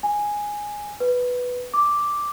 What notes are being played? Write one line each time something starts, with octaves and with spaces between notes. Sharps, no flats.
G#5
B4
D6